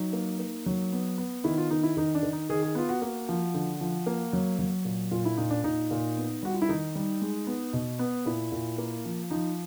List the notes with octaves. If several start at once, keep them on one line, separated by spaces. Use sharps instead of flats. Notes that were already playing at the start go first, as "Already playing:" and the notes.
Already playing: F#3 D#4
A#3
A#3
F#3
B3
B3
D#3 E4
F4
D#3 D#4
E4
D#3 D#4
D4
D#3
D#4
D#3 G#4
G#4
B3 F4
F#4
A#3 F#4
F3
D3
F3
A#3
F#3
F#3
A#2
A#2 F4
E4
A#2 D#4
D4
A#2 D#4
A#2
B3
G3 F#4
F4
E4
D#3 D#4
G3
G#3
B3
B2
B3
A#2 E4
A#2
A#3
F3
F3 D#4